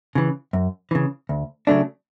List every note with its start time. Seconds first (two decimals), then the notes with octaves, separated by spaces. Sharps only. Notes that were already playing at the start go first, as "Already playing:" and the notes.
0.15 C#3 E3
0.53 F#2
0.91 C#3 E3
1.29 D2
1.67 C#3 F#3 A3 D4